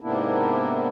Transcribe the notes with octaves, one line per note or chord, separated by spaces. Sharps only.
G#2 C3 A#3 B3 D4 E4